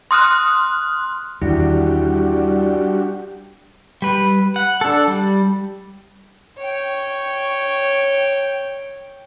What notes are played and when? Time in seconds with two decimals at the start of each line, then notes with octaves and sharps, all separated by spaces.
0.11 C6 D#6 F6 F#6
1.42 E2 D#3 G3 D4 E4 F#4 G4
4.02 G3 B4
4.56 F#5
4.81 D4 A4
5.08 G3
6.58 C#5 G5